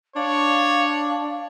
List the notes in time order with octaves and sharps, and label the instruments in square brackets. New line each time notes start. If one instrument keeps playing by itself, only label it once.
[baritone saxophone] D4 [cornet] C#5 [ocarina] F5